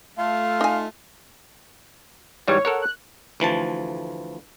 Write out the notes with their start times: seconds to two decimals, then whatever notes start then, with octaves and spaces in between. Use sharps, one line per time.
0.17 A3 F4 F5
0.61 D#4 G#5
2.48 G#2 E3 G3 C#5
2.65 A4 A#4 C#5 F#5
2.82 F#6
3.40 D2 E3 F3 A5